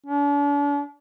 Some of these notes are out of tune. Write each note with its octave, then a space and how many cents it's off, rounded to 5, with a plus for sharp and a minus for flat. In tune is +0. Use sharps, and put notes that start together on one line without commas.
D4 -40